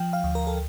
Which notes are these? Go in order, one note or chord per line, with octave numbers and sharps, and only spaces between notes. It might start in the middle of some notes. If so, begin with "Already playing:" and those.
Already playing: F3 G5
F5
D2
A#4
A4